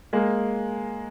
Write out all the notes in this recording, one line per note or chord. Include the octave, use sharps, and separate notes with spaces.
G#3 A#3